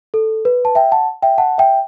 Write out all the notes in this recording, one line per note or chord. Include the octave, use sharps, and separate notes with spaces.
A4
B4
A5
E5 G5
F#5 A5
E5 G5
F#5 A5
E5 G5